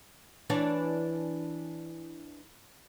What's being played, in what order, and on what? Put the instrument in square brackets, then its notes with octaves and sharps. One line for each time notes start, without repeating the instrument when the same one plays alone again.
[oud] E3 D4 C#5